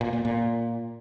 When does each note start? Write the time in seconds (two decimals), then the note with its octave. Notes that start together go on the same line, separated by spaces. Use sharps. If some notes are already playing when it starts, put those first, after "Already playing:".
0.01 A#2
0.13 A#2
0.25 A#2